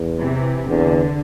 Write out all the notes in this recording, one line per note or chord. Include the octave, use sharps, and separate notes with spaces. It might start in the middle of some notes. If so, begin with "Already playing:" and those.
Already playing: E2
C3 E3
E2 D3